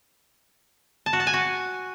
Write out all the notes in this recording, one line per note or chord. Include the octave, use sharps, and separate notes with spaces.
A5
F#4
A5
G#5
F#4